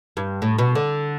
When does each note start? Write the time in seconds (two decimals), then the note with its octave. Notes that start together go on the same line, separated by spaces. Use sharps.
0.17 G2
0.42 A2
0.58 B2
0.75 D3